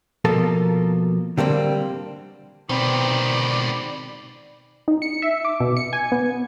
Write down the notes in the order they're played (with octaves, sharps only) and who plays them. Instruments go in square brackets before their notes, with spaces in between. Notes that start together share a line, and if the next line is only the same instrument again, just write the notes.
[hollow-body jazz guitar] B2 F3 A#3 A4 A#4 A5
D3 G3 A#3 C4
[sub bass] B2 [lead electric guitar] D#3 B3 [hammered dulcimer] C4 [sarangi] D5
[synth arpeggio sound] D#4
C#7
E5
D6
B2
C#7
G#5
B3